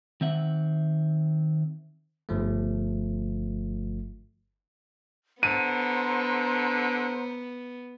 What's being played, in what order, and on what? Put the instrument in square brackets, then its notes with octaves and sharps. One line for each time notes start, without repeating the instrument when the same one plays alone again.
[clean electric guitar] D#3 C4 E5 F#5
[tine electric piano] G1 F3 A3
[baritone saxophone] D3 [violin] B3 [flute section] C5 A#5 [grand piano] D#7